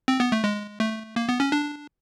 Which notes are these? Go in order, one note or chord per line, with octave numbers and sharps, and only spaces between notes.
C4
B3
A3
G#3
A3
A#3
B3
C#4
D4